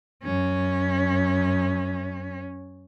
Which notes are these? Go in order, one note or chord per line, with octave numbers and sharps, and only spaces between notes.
F#2 C#4